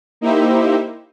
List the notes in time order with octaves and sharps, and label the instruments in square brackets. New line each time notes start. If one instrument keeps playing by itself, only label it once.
[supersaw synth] A#3 D#4 E4 G4 C5 E5